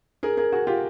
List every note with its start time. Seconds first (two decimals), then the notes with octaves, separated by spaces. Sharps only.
0.23 G#4 A#4
0.37 G#4 A#4
0.52 F#4 G#4
0.67 F4 G4